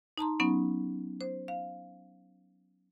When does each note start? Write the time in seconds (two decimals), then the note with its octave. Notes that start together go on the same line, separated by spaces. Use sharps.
0.18 D#4 A5 A#5 C6
0.40 F#3 B3 C#4 D#4
1.21 C5
1.48 F5